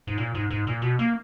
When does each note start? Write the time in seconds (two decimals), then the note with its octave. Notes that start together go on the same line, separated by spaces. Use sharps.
0.07 G#2
0.18 A#2
0.35 G#2
0.51 G#2
0.67 A#2
0.82 B2
0.99 A#3